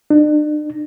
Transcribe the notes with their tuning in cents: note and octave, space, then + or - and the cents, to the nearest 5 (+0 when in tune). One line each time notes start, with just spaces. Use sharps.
D4 +40